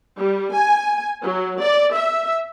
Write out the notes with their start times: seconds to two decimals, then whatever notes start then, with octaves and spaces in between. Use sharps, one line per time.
0.17 G3
0.54 G#5
1.23 F#3
1.61 D5
1.95 E5